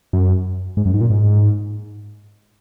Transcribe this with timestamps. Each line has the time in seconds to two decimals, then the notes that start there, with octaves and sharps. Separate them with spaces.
0.13 F#2
0.77 G#2
0.85 F#2
0.94 G#2
1.01 A#2
1.10 G#2